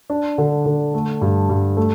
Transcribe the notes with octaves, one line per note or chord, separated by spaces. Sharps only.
D4
D3
D3
A3
G2
G2
A3